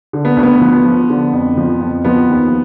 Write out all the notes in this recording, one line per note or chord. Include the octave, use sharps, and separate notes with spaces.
D3
B3
D2
B3
F3
F3
D3
F2
F3
F2
F3 B3
D#2